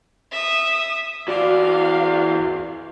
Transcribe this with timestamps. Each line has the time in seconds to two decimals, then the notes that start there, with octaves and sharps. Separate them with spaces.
0.32 E5 D#6
1.28 E3 F#4 D5 F5